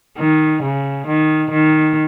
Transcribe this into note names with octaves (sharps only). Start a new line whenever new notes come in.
D#3
C#3
D#3
D#3